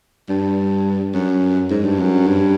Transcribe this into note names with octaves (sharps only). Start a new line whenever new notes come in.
G2
F#2
G#2
G2
F#2
G2